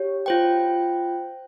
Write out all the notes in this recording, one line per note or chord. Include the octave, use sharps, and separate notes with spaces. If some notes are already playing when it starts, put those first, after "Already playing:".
Already playing: G4 C#5
F4 C5 G5